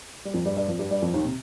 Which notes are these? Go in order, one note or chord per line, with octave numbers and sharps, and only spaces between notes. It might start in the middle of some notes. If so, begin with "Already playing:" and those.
G3
F2 F3
G2 G3
G2 G3
F2 F3
G2 G3
G2 G3
F2 F3
D#2 D#3
C3